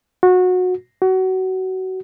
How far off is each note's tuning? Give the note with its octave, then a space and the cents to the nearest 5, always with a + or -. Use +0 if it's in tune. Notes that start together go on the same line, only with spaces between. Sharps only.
F#4 -20
F#4 +25